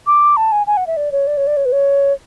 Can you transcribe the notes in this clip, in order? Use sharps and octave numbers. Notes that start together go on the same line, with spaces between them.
D6
A5
G#5
G#5
F#5
E5
D5
C#5
D5
C#5
D5
C#5
B4
C#5